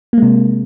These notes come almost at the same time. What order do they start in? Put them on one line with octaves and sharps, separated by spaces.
A#3 G#3 C3